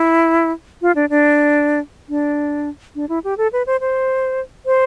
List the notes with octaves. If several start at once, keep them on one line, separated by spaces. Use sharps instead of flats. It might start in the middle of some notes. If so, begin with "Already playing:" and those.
Already playing: E4
F4
D4
D4
D4
D4
E4
G4
A4
B4
C5
C5
C5